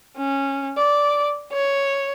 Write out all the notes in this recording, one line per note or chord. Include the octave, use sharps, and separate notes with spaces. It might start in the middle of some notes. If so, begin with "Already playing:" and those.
C#4
D5
C#5